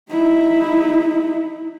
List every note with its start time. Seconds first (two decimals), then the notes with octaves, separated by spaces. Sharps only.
0.10 D#4 E4